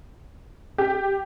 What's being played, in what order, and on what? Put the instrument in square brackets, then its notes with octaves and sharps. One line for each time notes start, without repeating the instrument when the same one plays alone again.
[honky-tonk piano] G4